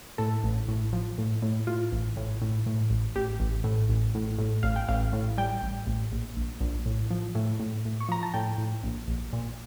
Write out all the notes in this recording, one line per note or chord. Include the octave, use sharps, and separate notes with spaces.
A2 A4
A1
A2
F3
A2
A2
A2 F4
A1
A2
A2
A2
A1
A1 G4
A1
A2
A1
A2
A2
A1 F5
G5
A1 F5
A2
G3 G5
A1
A1
A#1
A#1
A#1
A2
F3
A2
A2
A2
C#6
F3 A#5
A5
A2 G5
A2
A#1
A#1
A#2